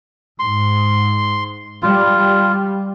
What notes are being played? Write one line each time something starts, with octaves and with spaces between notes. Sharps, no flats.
G#2 C6
G3 F4